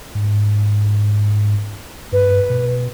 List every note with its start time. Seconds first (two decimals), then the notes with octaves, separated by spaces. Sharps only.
0.15 G#2
2.12 G2 B4
2.50 B2